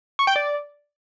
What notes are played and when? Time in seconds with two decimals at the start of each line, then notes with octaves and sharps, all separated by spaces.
0.19 C#6
0.27 G5
0.36 D5